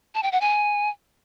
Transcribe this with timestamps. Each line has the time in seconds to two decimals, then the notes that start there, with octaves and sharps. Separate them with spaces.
0.15 A5
0.23 G5
0.32 F#5
0.41 G#5